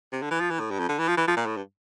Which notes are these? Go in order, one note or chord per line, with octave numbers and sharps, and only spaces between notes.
C3
D3
E3
F3
E3
A2
G2
F2
D3
E3
F3
E3
F3
A#2
A2
G2